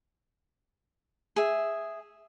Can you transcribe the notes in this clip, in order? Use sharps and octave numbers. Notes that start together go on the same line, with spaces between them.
G#4 E5